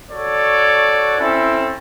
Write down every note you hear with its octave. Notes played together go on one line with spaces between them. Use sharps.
F#4 A4 C#5 D5
C4 C#4 E4 A4